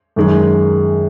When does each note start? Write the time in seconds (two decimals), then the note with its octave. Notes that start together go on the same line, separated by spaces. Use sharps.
0.16 F#2 D#3 G#3